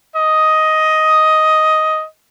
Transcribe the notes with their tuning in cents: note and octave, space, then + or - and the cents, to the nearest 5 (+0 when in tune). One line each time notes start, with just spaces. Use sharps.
D#5 +10